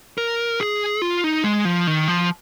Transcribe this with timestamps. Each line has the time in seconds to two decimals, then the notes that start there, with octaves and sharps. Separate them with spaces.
0.18 A#4
0.61 G#4
1.02 F4
1.24 D#4
1.44 G#3
1.65 F3
1.87 D#3
2.08 F3